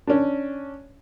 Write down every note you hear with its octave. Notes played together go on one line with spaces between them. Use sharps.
C#4 D4